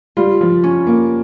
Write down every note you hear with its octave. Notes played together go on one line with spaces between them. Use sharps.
G3 F4
F3
C#4
A#3